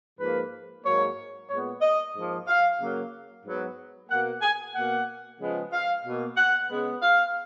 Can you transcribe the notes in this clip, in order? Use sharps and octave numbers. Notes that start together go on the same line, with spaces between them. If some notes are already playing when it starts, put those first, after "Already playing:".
G#2 F3 A#3 B4
G#2 F#3 A#3 C#5
A#2 G#3 B3 C#5
D#5
G#2 F3 A#3
F5
C#3 F#3 A#3
G#2 F#3 B3
B2 A#3 F#5
G#5
B2 A#3 F#5
C#3 F3 G#3 B3
F5
B2 A#3
F#5
C#3 G#3 B3
F5